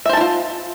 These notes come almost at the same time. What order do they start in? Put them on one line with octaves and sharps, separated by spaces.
E5 C5 A5 E4 F4